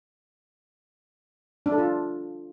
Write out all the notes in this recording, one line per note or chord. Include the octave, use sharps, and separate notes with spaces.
D4
A4
F4